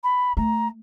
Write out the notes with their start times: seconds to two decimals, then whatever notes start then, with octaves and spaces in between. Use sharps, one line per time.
0.03 B5
0.37 A3 A#5